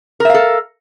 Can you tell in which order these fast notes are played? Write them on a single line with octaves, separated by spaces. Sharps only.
A#4 E5 F5 A4